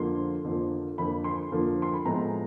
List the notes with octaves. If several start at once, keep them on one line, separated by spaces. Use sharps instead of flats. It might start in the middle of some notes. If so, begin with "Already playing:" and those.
Already playing: F2 D3 F3 A#3 C6
F2 D3 F3 A#3
F2 D3 F3 A#3 B5
C6
F2 D3 F3 A#3
C6
B5
A2 F3 G#3 B3 A#5